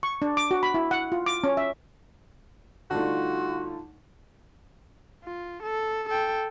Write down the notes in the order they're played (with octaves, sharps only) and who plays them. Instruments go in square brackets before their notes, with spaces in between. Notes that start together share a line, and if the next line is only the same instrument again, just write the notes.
[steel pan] C#6
D4
D6
F#4
B5
E4
F#5
F4
D6
C#4
E5
[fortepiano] D3 G3 A3 [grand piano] D#4 A5 [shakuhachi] F4 [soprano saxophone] F#4
[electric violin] F4
A4
A4 G5